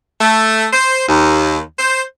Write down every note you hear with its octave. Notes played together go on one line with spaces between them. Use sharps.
A3
C5
D#2
C5